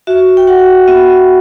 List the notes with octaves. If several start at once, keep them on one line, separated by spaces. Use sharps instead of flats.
F#4 E5
G5
F#4 F#5
B3 E5